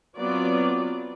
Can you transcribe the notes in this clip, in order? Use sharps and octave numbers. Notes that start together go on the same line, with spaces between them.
F#3 B3 C4 F4 D5